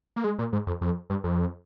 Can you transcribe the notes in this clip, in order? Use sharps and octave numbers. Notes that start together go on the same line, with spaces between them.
A#3
G#3
A#2
G#2
F2
F2
G2
F2